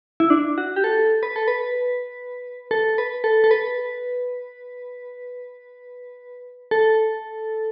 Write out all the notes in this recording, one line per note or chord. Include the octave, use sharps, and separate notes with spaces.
E4
D4
F#4
G4
A4
B4
A4
B4
A4
B4
A4
A4
B4
A4